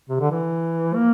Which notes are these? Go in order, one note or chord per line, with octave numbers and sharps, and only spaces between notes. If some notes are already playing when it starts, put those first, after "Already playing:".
C3
D3
E3
A#3